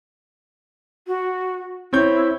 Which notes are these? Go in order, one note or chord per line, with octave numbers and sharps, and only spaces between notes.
F#4
C4 E4 C#5 G6